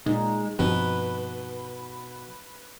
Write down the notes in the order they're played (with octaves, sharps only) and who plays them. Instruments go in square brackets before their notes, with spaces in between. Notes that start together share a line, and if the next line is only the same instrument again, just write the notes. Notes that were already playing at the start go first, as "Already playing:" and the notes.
[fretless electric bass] A#2 [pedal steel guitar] G#3 [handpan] D#4
[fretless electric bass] G2 F3 C4 [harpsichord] B2 [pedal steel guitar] B4